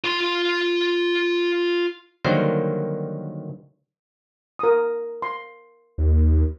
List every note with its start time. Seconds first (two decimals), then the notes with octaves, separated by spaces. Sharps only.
0.04 F4 C6
2.25 D3 D#3 F#3 G3 A#3 C5
4.59 A#4 D#6
5.22 C6
5.98 D#2